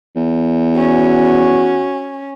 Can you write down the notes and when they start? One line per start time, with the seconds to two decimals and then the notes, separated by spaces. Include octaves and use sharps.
0.16 E2
0.76 C#4 F#4